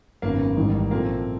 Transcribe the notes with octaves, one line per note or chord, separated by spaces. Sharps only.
G#1 F#2 C#3 F#3 A#3 B3
A1 G#2 D#3 G3
A#2 F3 A3 A#3 C4